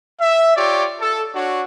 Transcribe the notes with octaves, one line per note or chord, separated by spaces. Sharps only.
E5
F4 G4 C#5 D5
A4
D4 F#4 C#5